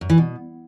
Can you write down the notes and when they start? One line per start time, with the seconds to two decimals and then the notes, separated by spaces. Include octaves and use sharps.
0.01 F#2
0.09 E3
0.18 B2